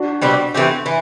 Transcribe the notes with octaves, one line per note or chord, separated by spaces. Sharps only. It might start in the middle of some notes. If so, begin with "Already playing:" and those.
Already playing: D4 F#4
B2 G3 C4 G4
E3 A3 C4 G4
E3